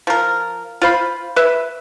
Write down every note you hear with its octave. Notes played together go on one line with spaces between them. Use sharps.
F3 A#4
F4 C5 B5
B4 E5